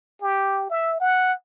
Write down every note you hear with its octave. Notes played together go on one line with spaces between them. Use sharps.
G4
E5
F#5